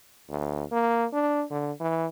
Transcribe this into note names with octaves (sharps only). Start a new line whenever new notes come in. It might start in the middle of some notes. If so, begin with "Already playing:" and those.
D2
A#3
D4
D3
E3